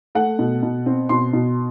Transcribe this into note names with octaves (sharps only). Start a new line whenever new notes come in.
A3 F#5
B2
B2
C4
B2 C6
B2